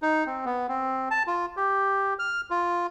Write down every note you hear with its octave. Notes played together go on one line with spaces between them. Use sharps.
D#4
C4
B3
C4
A5
F4
G4
F6
F4